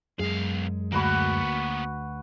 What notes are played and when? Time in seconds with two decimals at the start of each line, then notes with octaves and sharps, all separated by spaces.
0.19 B1 F#2 G#3 G#4 F5
0.92 D2 A#3 B3 F#4 B4 A#5 B5